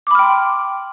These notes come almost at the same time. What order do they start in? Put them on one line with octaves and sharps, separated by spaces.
D6 B5 F6 G5 C6